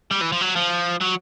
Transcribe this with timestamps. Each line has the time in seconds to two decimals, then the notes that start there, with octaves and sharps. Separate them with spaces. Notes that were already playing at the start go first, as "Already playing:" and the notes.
0.11 G3
0.22 E3
0.32 F3
0.41 F#3
0.56 F3
1.01 F#3